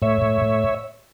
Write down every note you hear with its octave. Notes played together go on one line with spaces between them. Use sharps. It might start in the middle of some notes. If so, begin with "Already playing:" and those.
A2 C#5 E5
A2
A2